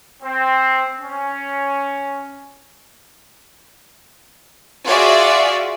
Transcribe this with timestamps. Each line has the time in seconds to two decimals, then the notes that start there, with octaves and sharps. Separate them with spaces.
0.23 C4
1.00 C#4
4.86 F4 F#4 G#4 D5 E5